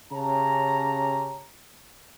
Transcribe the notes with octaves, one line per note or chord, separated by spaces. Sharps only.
C#3 C#4 G4 A5 A#5